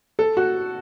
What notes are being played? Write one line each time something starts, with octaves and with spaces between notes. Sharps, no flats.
A4
F#4